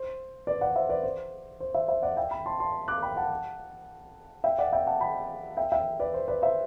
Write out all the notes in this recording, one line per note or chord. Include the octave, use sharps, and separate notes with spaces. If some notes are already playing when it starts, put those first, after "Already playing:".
Already playing: C5
B4 D5
D5 F#5
C5 E5
B4 D5
C5
C5
C5 E5
C5 E5
D5 F#5
E5 G5
G5 B5
A5 C6
A5 C6
D6 F#6
G5 B5
F#5 A5
E5 G5
D5 F#5
E5 G5
F#5 A5
G5 B5
E5 G5
E5 G5
B4 D5
C5
B4 D5
C5 E5